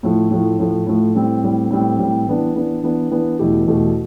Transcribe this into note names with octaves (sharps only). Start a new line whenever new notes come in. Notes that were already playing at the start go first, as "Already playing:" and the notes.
A2 F3 A3
A2 F3 A3
A2 F3 A3
A2 F3 A3
A2 G3 C4
A2 G3 C4
A2 G3 C4
A2 G3 C4
E3 B3 D4
E3 B3 D4
E3 B3 D4
E3 B3 D4
E2 B2 A3 E4 G4
E2 B2 A3 E4 G4